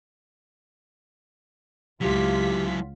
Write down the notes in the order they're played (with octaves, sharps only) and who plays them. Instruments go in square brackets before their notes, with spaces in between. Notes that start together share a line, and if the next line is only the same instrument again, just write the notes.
[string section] C#2 F4 B6 [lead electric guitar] F#3 E4 [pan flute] G4